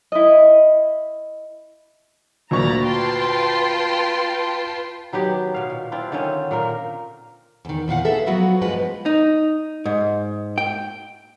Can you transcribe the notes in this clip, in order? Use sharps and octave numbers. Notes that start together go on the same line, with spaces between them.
E4 D#5
D2 A#2 A#5 B5 C#6 A6
F4 B4 G5 A5 C6
D#3 F#3 B3 G4
B2 F5
A#2
C4 D4 E4 F4
D3 D#3 C4 C#4
A#2 A#3 A#4
E2 D#3
E2 A#2 F5 F#5
G#4 A4 B4 E5
F3 F#3 B3 F#4
G2 F3 G#3 B3 B4
D#4
G#2
G5